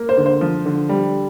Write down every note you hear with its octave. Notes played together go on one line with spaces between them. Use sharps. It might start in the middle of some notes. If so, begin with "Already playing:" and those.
Already playing: A#3
C5
D3
C5
F3
D3
G3